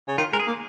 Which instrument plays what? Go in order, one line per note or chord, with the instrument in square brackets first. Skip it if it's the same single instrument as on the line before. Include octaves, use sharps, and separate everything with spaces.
[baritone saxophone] C#3
[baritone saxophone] D#3 [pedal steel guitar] F4
[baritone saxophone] G#3 [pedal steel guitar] A#4
[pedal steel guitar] G#4
[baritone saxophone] A#3